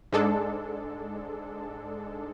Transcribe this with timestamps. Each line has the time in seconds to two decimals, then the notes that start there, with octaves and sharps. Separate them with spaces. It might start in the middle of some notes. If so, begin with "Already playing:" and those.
0.12 G#2 G#3 D4 A4